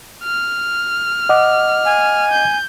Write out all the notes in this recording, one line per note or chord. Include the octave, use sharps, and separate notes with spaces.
F6
D#5 F#5 D6
G#5
G6